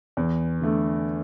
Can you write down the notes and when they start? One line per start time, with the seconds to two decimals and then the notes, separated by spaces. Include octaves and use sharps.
0.17 E2
0.61 D3 A3